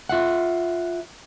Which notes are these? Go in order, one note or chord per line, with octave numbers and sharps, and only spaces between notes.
F4 E5 F#5